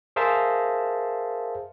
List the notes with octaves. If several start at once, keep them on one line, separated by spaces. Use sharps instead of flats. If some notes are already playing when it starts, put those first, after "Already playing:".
G#4 A#4 C5 E5 F5 A5